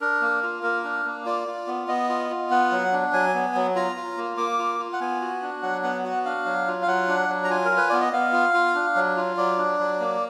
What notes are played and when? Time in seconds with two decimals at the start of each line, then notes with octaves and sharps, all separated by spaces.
0.01 D4 A#4
0.21 A#3
0.43 F4
0.63 A#3 A#4
0.84 D4
1.06 A#3
1.26 F4 D5
1.47 F4
1.67 B3
1.88 B3 D#5
2.09 F4
2.30 F4
2.50 B3 F#5
2.72 F#3
2.92 D4
3.13 F#3 G#5
3.34 B3
3.55 F#3
3.75 F4 A#5
3.96 F4
4.17 A#3
4.37 A#3 D6
4.59 F4
4.79 F4
4.93 F#5
5.00 B3 G#5
5.21 F#4
5.42 D4
5.63 F#3 F#5
5.83 B3 F#5
6.04 F#4 F#5
6.25 D4 F5
6.45 F#3
6.67 F4
6.82 F5
6.87 F#3 F#5
7.08 D4
7.29 F#3
7.44 A#5
7.50 F4 G#5
7.65 A#4
7.71 F4
7.77 B4
7.89 B3 D5
8.01 D#5
8.12 B3 F5
8.33 F4
8.54 F4
8.75 D4
8.95 F#3
9.17 F4
9.37 F#3 D5
9.58 D4
9.79 F#3
10.00 A#3